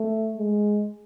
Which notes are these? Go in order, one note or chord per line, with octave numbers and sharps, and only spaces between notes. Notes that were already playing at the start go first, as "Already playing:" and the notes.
Already playing: A3
G#3